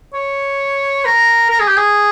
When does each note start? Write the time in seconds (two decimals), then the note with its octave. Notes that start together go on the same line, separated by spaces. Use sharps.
0.13 C#5
1.05 A#4
1.50 A#4
1.60 G#4
1.68 G4
1.77 G#4